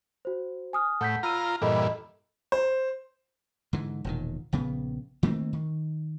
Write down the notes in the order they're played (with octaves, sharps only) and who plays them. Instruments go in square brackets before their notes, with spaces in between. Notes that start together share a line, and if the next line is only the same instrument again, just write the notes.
[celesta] F#4 C5
G#5 D#6 F6
[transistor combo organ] A2 [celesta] F#5 G6 B6
[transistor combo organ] F4 A#5 [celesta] B5 E6 D#7
[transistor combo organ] G2 A#2 E3 [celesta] A4 D#5 B5
[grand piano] C5
[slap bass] G#2 D3 E3
E1 A#2 D#3
A#1 C#3 B3
D#3 A3 A#3 C4
D#3